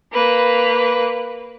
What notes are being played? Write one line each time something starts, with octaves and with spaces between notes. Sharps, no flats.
A#3 B4